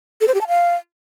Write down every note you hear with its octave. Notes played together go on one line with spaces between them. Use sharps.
A4
C5
G4
A5
F5